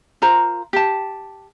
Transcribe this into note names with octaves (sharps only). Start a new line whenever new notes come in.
F4 A#4 C5 A#5
G4 A5